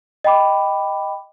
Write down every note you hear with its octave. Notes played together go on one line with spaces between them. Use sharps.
D#5 G5 B5 D6